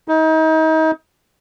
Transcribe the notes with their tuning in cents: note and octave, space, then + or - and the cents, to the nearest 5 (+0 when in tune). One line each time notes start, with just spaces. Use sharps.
D#4 +35